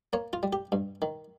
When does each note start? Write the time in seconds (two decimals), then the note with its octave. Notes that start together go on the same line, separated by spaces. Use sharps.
0.13 A#3 C#5
0.33 F4
0.43 G3
0.53 G4
0.72 G2
1.02 D#3